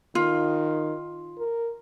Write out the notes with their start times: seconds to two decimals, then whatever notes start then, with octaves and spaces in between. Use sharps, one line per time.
0.15 D#3 F4
1.38 A#4